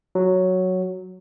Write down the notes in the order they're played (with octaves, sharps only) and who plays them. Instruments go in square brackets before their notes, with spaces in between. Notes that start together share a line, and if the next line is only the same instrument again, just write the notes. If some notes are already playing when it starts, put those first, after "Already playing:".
[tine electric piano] F#3